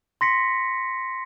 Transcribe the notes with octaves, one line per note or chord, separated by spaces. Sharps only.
C6 A#6 B6 C#7